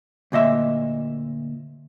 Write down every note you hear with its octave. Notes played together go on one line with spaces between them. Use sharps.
D2 A#2 D#5 E5